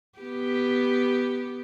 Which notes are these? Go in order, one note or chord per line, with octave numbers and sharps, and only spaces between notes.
B3 G4